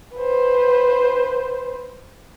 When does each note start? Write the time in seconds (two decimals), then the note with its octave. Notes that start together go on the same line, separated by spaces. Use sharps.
0.15 B4 C5